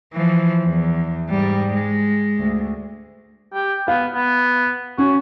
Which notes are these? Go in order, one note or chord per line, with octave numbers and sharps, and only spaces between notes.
E3 F3
E2
G#2 G3
G#3
D2
G4
B3 F5
B3
C#4 F#4